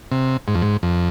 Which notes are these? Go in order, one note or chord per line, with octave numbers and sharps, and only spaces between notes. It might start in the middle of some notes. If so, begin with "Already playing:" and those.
C3
G#2
F2
G#2
F2